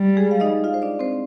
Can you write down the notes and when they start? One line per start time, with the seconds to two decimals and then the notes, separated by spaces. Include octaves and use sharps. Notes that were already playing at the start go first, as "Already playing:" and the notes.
Already playing: G3
0.17 G#3 G#4
0.31 F5
0.40 D#4 D#5
0.64 F4 F5
0.74 C5
0.82 D4 D5
0.99 C4 C5